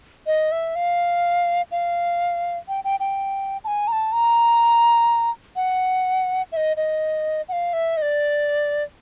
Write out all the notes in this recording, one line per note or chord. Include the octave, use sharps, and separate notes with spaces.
D#5
E5
F5
F5
G5
G5
G5
A5
G#5
A#5
A5
A#5
F#5
E5
D#5
D#5
F#5
F5
E5
D#5
D5